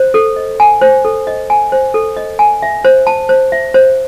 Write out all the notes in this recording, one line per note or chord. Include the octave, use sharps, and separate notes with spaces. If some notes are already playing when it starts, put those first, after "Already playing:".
Already playing: C5
A4
D#5
G#5
C5
A4
D#5
G#5
C5
A4
D#5
G#5
E5
C5
A5
C5
E5
C5